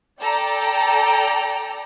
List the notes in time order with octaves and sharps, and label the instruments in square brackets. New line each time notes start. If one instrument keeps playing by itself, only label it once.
[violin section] A4 D5 G5 A#5